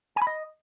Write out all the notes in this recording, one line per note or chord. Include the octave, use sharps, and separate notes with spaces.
G#5
B5
D#5